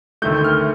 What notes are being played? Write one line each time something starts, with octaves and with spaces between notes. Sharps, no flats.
D2 C3 D#3 A3 G6
F6